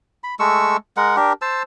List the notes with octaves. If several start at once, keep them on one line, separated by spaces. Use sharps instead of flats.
B5
G#3 A3 C#6 E6
G#3 A#4 F#5
D4 G4 A#4
C5 A5 E6